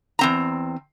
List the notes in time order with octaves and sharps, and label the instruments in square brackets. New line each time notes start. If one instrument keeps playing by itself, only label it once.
[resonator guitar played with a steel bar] E2 C4 A#5